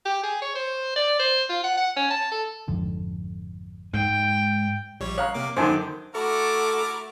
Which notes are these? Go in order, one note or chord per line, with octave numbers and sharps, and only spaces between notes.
G4
G#4
C#5
C5
D5
C5
F4
F#5
F#5
C#4
A5
A4
G#1 F2 D3
G#2 G#3 G5
A#1 G3 C#5
C#5 F5 A#5 F#6
C3 A#3 D6
F#2 D3 D#3 C5 G#5 A5 D6
A3 E4 F#4 A4 A#4 D6